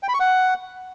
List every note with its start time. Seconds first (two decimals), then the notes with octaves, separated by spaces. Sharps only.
0.03 G5
0.08 B5
0.14 C#6
0.20 F#5